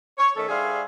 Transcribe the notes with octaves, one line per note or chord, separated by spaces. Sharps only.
C#5
D#3 A3 C#4 A4
G3 D4 G#4 C5 E5 F5